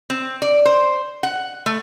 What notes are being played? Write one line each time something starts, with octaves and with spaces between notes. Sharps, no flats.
C4
D5
C5
F#5
A3